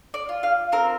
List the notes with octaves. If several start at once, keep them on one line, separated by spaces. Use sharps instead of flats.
D5
F4
F5
C4 A#4